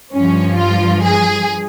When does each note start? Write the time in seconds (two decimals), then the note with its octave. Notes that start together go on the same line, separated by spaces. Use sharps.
0.14 G2 F3 C#4
0.57 F4
1.03 G#4